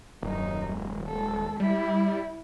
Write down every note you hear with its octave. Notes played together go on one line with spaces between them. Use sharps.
D#1 F#2 D#4
G#3
G#3 A4
G3 E4